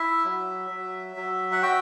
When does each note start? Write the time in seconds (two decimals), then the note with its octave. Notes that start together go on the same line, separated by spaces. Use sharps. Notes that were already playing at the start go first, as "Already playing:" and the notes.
Already playing: E4 E5
0.25 F#3
0.71 F#3
1.16 F#3
1.52 F#5
1.62 F#4 G5